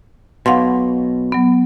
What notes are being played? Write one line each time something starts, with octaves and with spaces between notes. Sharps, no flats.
B1 B2 F5 F#5 C6
F#3 B3